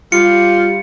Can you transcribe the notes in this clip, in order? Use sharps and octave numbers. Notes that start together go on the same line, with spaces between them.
G3 F4 C#7